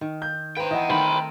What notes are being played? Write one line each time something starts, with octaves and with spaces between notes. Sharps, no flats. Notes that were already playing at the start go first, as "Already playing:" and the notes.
D#3
G6
B4 C5 G5 A#5
E3 B3 D#5
D#3 A3 C4 C5 B5